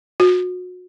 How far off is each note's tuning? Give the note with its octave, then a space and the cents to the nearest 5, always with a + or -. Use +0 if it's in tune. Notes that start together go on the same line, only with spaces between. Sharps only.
F#4 -30